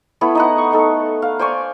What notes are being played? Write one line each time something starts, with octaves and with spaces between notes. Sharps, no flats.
A3 B3 E4
D#4 D#5 F#5
C#6
A3 D#4 A4
F5
C5 D5 G#5 C#6